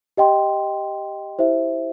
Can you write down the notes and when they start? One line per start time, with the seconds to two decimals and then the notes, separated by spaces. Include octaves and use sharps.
0.17 G4 D#5 G5 C6
1.39 E4 G4 C5 E5